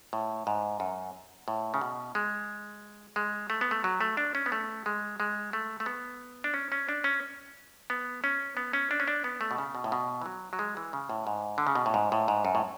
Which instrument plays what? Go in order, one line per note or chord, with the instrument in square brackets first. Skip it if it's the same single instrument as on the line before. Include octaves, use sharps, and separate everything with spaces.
[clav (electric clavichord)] A2
G#2
F#2
A2
C#3
B2
G#3
G#3
A3
B3
A3
F#3
A3
D4
C#4
B3
A3
G#3
G#3
A3
A3
B3
D4
C#4
C#4
D4
C#4
B3
C#4
B3
C#4
D4
C#4
D4
B3
A3
B2
C#3
B2
A2
B2
E3
F#3
F#3
G#3
E3
C#3
A2
G#2
D3
C#3
B2
A2
G#2
A2
G#2
F#2
A2